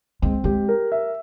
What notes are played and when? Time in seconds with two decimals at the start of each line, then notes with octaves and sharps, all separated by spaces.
0.22 G#3 C4
0.44 G#3 G4
0.69 A#4
0.92 E5